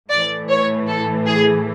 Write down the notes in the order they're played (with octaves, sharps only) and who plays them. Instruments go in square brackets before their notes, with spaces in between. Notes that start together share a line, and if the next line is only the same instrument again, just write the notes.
[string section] A2 E3 A3 D5
C#5
A4
G#4